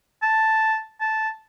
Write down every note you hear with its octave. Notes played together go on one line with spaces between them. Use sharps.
A5
A5